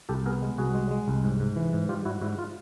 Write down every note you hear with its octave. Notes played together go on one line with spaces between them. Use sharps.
C2 G4 A4
B3 G#4 A#4
G#3
C2 F#4 G#4
G#3
G#3
C2
G#2
G#2
E3
G#2
G3 F4 G4
G#2 E4 F#4
G#2 E4 F#4
F4